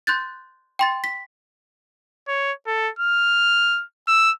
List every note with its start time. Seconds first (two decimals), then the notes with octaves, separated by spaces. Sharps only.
0.07 C6 F#6 G6 A6
0.79 G5 C6 A6
1.04 B6
2.28 C#5
2.67 A4
2.99 F6
4.08 E6